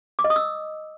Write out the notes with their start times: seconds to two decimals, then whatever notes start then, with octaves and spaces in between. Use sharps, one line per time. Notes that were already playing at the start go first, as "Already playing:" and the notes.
0.19 D6
0.24 D#5
0.30 D#6
0.36 E6